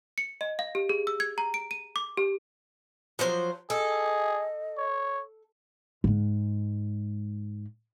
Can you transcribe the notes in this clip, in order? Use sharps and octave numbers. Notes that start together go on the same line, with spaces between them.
C#7
D#5
F5
G4
G#4
E6
G#6
A#5
D7
D#7
D6
G4
F3 F#3 C5
G#4 A4 D#5
C#5
G#2 G#3